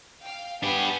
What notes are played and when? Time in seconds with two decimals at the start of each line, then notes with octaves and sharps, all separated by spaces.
0.23 F5 G5
0.63 B3 D4 G4 G#5